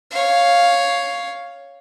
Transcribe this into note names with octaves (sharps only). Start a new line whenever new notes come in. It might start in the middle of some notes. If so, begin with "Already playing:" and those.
C#5 F5